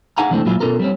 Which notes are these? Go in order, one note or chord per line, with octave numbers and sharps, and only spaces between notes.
D#4 G#4 F5 F#5 G#5 A#5
C3 E3 G#3 A3 C4 D4
A#2 F#3 G#3 E4 F4 G#4
B2 E3 C#4 F4 A4 A#4
G3 C4 C#4